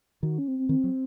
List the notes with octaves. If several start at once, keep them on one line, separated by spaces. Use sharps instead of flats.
D#3 F#4
C#4
C4
C4
D#3 C4
F#3